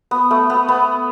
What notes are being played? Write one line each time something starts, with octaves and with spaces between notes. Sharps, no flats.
B3
A3
B3
B3